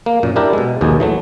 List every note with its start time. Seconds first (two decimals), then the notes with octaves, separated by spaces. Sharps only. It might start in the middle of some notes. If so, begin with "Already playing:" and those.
0.06 A#3
0.23 F#2 A#2
0.36 D4 E4 G4 A#4 D5
0.53 B2 G#3
0.81 A#1 D#2 B2 G#4
1.00 E3 F#3 A3